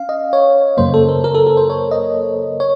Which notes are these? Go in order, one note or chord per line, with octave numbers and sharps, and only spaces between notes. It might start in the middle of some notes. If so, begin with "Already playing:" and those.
Already playing: C#4 F5
D#5
C#5
F#2 C#3 F#3 A#3 C5
A4
A#4
A#4
A4
A4
C5
C#5
D#5
C#5